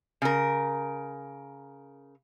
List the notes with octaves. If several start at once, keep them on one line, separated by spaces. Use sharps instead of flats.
C#3 A#4